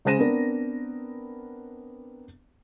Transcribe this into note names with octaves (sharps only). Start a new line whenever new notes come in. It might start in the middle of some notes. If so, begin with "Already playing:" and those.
C#3 G#3 C5 A#6 D#7 E7
B3 C4 D4 A#4